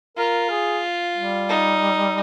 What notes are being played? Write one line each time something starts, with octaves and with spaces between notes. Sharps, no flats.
F4 A#4
G#4
G3
D#4